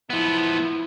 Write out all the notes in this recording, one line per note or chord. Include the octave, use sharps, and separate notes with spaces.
F3 B3 E4